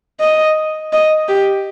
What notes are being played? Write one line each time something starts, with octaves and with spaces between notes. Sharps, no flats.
D#5
D#5
G4